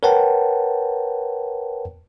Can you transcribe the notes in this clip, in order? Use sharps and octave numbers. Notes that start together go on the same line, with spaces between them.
A#4 B4 C#5 F#5 G5 A5